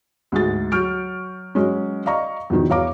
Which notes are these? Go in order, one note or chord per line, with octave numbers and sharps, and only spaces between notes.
D2 G#2 G#3 G#4 A6
F#3 C#6 F6 G6 D7
F#3 G#3 C#4
D5 D#5 F5 A#5 C#6
E2 B2 D#3 F3
E2 C#5 F5 A#5 D6